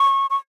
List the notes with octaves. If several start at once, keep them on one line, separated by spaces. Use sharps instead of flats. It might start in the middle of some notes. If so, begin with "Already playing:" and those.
Already playing: C#6
C#6